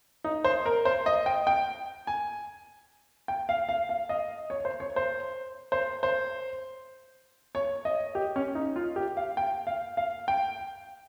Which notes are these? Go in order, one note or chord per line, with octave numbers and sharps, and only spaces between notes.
D#4
C5
A#4
C5
D#5
G5
G5
G#5
G5
F5
F5
F5
D#5
C#5
C5
C#5
C5
C5
C5
C#5
D#5
G4
C#4
D#4
F4
G4
F5
G5
F5
F5
G5